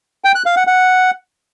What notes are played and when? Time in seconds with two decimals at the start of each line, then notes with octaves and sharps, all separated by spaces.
0.24 G5
0.35 F#6
0.46 F5
0.56 F#5
0.67 F#5